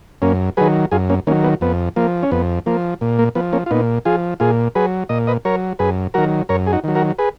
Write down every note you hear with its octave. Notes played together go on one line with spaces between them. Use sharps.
F#2 A#3 C#4
D#3 F#3 G#4 B4
F#2 F4 G#4
A#3 C#4
D#3 F#3 A#3 C#4
B3
F2 B3
F3 A#3
C#4
F2 B3
F3 A#3
A#2
A#3
F3 B3
A#3 C#4
F4
A#2 B3 D#4
F3 F4 G#4
A#2 F4 G#4
F#3 G#4 B4
A#2 D#5
B4 D#5
F#3 A#4 C#5
F#2 G#4 B4
D#3 F#3 F#4 A#4
F#2 A#4 C#5
G#4
D#4 F#4
D#3 F#3
F#4 A#4
G#4 B4